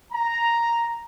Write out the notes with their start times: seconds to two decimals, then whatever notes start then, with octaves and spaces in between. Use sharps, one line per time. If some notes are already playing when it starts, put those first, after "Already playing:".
0.12 A#5